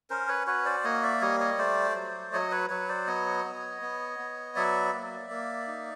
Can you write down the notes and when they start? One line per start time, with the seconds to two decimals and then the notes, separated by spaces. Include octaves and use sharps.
0.10 C#4 A#4 C5
0.29 B4 C#5
0.47 F#4 B4 C#5
0.65 C5 D5
0.84 A#3 C#5 D#5
1.03 D5 E5
1.22 G3 C#5 D#5
1.40 C#5 D#5
1.58 A3 C5 D5
1.95 F#3
2.33 F#3 C#5 D#5
2.51 B4 C#5
2.70 F#3 B4 C#5
2.89 C5 D5
3.07 B3 C#5 D#5
3.45 B3
3.82 B3
4.19 B3
4.56 F#3 D5 E5
4.93 A#3
5.30 A#3
5.67 D#4